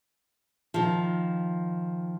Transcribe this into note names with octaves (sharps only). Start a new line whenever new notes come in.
D#3 F3